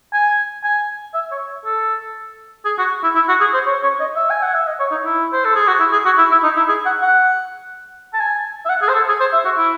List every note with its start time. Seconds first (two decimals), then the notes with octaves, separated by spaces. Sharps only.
0.13 G#5
0.64 G#5
1.14 E5
1.31 C#5
1.65 A4
2.65 G#4
2.78 F#4
3.04 E4
3.15 E4
3.28 F#4
3.41 G#4
3.54 C5
3.66 C#5
3.83 C#5
4.00 D#5
4.16 E5
4.30 G#5
4.42 F#5
4.54 E5
4.67 D#5
4.80 C#5
4.91 D#4
5.05 E4
5.33 C5
5.45 A4
5.55 G#4
5.68 F#4
5.80 E4
5.92 G#4
6.05 F#4
6.18 E4
6.31 E4
6.43 D#4
6.56 E4
6.69 G#4
6.86 F#5
7.02 F#5
8.14 A5
8.20 G#5
8.65 E5
8.69 F#5
8.82 G#4
8.89 C5
8.95 A4
9.08 G#4
9.20 C5
9.33 E5
9.45 F#4
9.58 E4